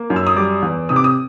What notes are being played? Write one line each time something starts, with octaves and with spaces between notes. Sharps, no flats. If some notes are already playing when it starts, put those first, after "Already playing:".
Already playing: A#3
F#2
E6
D#6
G3 D6
E2
C3 D#6
D6
D#6